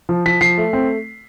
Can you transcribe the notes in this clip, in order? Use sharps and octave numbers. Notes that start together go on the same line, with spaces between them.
F3
F3 B6
F3 C7
A3
C4